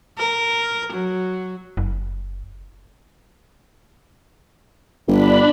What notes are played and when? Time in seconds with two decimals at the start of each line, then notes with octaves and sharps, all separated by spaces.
0.18 A#4
0.93 F#3
1.77 F#1
5.08 G1 D4 B5